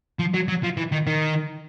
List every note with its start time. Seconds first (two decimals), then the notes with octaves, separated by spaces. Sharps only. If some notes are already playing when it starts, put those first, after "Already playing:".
0.19 F3
0.34 F#3
0.48 F#3
0.63 F3
0.77 E3
0.92 D#3
1.07 D#3